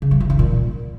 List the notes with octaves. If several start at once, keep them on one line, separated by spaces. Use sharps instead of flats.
C#3
F#3
F3
E3
A#2